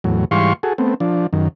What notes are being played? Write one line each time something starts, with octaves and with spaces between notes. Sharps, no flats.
E2 A2 F#3
G#2 E3 G3 F5 C6 C#6
F#4 G#4 A4
A3 B3 C4
F3 D4
F#2 D#3